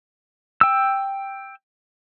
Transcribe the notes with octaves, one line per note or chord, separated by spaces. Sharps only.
G5 E6